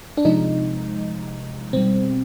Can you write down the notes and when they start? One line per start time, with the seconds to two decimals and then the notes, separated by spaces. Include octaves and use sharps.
0.17 D4
0.25 C3 F3 G#3 D#4
1.73 B2 G3 C4